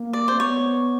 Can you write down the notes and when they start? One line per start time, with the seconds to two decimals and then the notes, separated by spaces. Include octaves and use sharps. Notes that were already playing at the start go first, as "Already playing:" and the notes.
Already playing: A#3
0.13 D5
0.28 C4 C5
0.39 B3 C#5